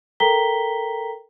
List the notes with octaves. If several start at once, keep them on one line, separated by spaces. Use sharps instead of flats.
A4 A#4 G5 A#5 B6 G7